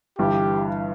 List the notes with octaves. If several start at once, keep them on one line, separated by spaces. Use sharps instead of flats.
G1 G2 E3 G4